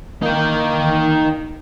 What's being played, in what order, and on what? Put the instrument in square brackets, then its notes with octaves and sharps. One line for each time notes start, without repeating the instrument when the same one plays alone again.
[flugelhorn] A#3 [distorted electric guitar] D#4 G5